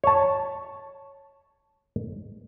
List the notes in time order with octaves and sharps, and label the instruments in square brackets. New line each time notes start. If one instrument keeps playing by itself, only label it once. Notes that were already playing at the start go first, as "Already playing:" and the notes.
[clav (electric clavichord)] C#5 A5